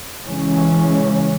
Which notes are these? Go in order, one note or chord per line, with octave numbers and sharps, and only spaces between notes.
C#3 E3 G#3 C#4